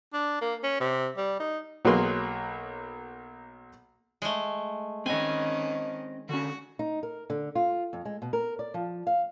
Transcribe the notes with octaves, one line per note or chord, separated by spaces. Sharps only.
D4
A#3
C#4
C3
G3
D#4
B1 F#3 A#3 G#4 B4 C6
G#3 A3
D#3 C4 C#4 D#5 G#5
D3 C#4 F#4
D#4
A#4
D3
F4
F2
G#3
B2
A#4
D5
F3
F5